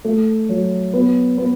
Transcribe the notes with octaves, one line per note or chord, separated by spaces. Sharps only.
A3
F#3
B3
B3